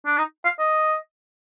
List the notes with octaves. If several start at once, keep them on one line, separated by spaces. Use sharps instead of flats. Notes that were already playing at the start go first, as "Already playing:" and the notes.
D4
D#4
F5
D#5